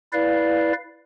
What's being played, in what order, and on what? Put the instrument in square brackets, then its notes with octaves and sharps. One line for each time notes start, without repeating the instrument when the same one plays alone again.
[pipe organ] E4 B4 D5 F5